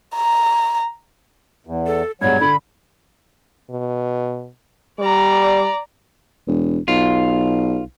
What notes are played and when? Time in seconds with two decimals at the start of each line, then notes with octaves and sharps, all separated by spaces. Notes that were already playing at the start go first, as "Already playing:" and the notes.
0.16 A#5
1.67 E2
1.87 A4
2.21 G2 B2 F#3 G#3 G#6
2.41 D3 B5
3.70 B2
5.00 G3 D5 A#5
6.47 E1
6.88 B1 F4